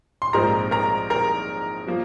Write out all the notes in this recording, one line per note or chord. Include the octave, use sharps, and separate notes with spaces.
C6
A#1 G#2 F3 G#3 C4 A#4 A#5
A#4 A#5
A#4 A#5
F3 A#3